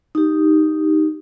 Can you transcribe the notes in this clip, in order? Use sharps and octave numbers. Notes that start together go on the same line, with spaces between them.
D#4 G4